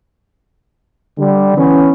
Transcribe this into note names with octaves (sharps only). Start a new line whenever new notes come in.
D3 G3
E3 B3 C#4